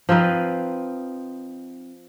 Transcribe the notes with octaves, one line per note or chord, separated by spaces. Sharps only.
F3 C4 D#4 B4